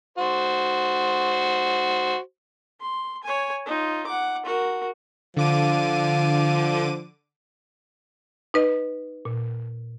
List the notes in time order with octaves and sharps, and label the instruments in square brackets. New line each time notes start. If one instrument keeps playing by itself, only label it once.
[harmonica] F#4 C5
[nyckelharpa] C6
C#5 G#5
D#4 F4
F#5 D6
F#4 A#4
[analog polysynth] D3 D6 D#7 [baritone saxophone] F3
[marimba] D#4 B4 D#5
A#2